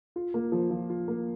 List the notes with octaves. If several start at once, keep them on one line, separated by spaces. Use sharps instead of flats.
F4
A#3
F3
F3
F4
A#3